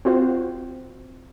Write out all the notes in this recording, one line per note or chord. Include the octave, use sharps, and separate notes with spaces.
C4 F4 F#4 C5